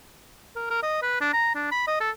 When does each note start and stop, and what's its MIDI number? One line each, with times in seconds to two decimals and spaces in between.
0.56 0.67 70
0.70 0.82 70
0.83 0.99 75
1.02 1.19 71
1.21 1.33 62
1.33 1.51 82
1.55 1.69 62
1.72 1.85 83
1.87 2.00 75
2.00 2.11 69